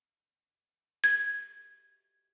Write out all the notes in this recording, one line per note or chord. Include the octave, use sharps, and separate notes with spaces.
G#6